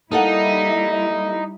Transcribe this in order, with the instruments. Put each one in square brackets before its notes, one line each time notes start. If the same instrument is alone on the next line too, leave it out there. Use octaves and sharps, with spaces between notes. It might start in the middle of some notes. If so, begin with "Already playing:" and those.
[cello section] G3 E4 [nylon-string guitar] A#3 A4 F#5 [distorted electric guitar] D#4